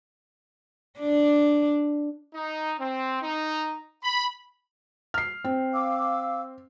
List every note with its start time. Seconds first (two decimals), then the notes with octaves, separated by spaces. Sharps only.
0.99 D4 D5
2.34 D#4
2.80 C4
3.22 D#4
4.04 B5
5.14 F6 C7
5.44 C4
5.73 F5 D6 E6